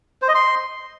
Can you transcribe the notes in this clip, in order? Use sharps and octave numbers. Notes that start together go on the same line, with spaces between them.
C5
D#5
C6